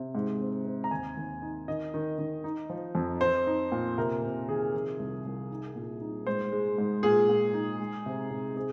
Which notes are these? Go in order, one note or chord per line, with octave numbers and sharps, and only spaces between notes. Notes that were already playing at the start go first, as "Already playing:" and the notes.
Already playing: C3
G#2
C4
C4
A#5
D#2 G#5
D#2
D#4
D#3 D#5
D#3
D#3
D#4
F3
F2
C4 C5
D#4
A#2
C3 A#4
C3
D#3 G#4
F3
C2
C2
D#4
A#2
D#4
G#2 C5
G#3
G#2
A#2 G#4
A#2
D#4
G#3
C3
C3
C4 G#4